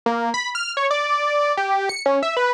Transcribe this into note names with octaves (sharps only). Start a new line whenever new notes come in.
A#3
B5
F6
C#5
D5
G4
C#7
C#4
E5
B4